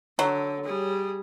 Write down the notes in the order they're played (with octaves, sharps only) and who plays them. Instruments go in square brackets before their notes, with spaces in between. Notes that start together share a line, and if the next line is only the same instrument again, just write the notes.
[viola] D3 [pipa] F#3
[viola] G3 G#4